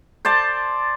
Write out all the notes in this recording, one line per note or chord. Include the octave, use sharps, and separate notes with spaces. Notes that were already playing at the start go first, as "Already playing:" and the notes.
C5 D5 A5